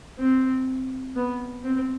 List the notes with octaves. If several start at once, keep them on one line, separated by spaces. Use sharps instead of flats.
C4
B3
C4